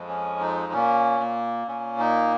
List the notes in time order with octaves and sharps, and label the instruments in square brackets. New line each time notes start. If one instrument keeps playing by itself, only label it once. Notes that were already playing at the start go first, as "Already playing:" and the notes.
Already playing: [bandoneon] F2 F3 G#3
C#4
D#4
A#2 A#3 C#4
A#3
A#2 A#3 C#4
D#4